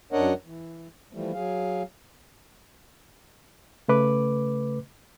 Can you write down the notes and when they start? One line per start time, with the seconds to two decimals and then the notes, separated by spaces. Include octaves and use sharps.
0.12 F#2 D4 A#4 C#5 D#5 F#5
0.45 E3
1.13 E3 F3 G3 A3
1.33 F#3 G#4 F5
3.88 C#3 A3 B4 D6